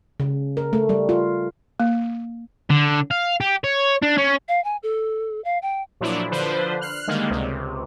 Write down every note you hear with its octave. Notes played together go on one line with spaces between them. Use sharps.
C#3
A#4
A3
G3
F4
A#3
D3
F5
G4
C#5
D4
C#4
F5
G#5
A4
F5
G5
A#2 F3 F#3 D4 E4
D3 F3 D4 B4 C5
F6 F#6 C7
D3 D#3 G3 G#3 A#3
C#2 C3